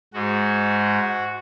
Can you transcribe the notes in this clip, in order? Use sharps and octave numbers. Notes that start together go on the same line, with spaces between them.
G#2 G#3 F#4